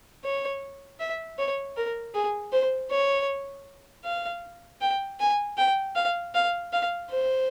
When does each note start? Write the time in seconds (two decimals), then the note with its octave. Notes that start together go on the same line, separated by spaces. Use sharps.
0.24 C#5
1.00 E5
1.38 C#5
1.77 A#4
2.14 G#4
2.52 C5
2.90 C#5
4.05 F5
4.81 G5
5.20 G#5
5.58 G5
5.95 F5
6.34 F5
6.73 F5
7.10 C5